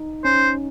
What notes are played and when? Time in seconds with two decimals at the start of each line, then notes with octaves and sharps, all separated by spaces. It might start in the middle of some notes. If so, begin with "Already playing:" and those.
Already playing: D#4
0.24 C#4 C5